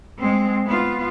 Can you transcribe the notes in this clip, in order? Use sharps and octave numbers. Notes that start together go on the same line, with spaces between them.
G#3 C4
B3 F4